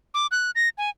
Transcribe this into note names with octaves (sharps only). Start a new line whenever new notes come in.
D6
F#6
A#6
G#5